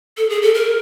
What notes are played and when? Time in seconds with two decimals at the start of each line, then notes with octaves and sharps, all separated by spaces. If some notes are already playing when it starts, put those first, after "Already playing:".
0.17 A4
0.29 G#4
0.42 A4
0.54 A#4